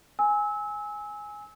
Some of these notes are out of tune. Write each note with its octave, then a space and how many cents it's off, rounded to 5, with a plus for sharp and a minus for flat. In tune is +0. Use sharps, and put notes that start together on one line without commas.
G#5 +0 E6 -30